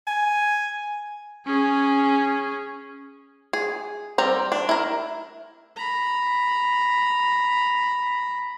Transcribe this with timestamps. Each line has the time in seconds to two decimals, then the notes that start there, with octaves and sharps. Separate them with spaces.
0.07 G#5
1.46 C#4 G#4
3.53 G#4
4.18 G3 C4 A#5
4.52 D4
4.69 E4 A#4
5.76 A#5 B5